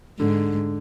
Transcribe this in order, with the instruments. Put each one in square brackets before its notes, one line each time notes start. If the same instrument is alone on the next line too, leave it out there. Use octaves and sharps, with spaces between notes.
[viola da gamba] G#2 [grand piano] D3